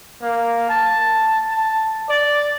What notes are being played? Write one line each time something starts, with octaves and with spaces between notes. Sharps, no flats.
A#3
A5
A5
D5